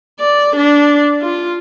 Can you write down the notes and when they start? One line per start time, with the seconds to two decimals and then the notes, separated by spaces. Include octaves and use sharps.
0.20 D5
0.56 D4
1.21 F4